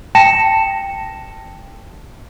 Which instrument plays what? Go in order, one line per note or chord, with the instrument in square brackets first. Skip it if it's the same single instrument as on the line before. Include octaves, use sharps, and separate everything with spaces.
[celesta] G5 A5 A#6 C#7 E7